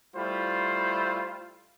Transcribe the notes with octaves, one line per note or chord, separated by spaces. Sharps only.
G3 A3 E4 F4 C5 B5